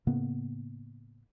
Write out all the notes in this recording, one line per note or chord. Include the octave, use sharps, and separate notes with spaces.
A2 C#3 A#3 B3